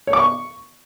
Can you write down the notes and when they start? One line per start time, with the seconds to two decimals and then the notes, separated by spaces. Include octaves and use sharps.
0.07 C#5
0.13 D6
0.19 C#6